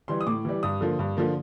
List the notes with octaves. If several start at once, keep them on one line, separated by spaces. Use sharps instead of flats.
E3 G3 C6
D#6
A2 D6
E3 G3
G2 D#6
D3 F3 A#3
G2
D3 F3 A#3